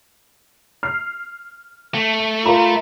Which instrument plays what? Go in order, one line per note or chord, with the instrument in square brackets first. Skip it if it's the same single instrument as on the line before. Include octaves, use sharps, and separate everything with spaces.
[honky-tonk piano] F6 C7
[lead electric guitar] A3
[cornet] F4 [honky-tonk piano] A#4 A#5 B5